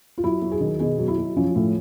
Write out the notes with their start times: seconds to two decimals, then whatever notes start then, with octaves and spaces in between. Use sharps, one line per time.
0.18 F4
0.24 F#3 E4
0.42 F#3
0.52 G#4
0.61 D#3
0.80 B2 G#4
0.98 F#3
1.08 E4
1.18 F#3
1.36 F3 C#4
1.56 A2